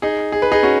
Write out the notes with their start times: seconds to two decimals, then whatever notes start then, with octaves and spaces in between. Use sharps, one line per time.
0.02 D#4 G#4
0.32 G#4
0.42 B4
0.52 D#4 G#4
0.63 C#4 F#4